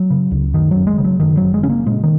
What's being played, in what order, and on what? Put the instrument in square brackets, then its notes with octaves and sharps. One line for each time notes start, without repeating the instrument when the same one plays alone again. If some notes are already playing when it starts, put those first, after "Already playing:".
Already playing: [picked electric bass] F#3
C#3
C#2
F#2 D#3
F#3
F#1
G#3
C#3
F#3
F#2 D#3
F#1 F#3
G#3
C#3 C#4
A#3
A#2 G#3
D#3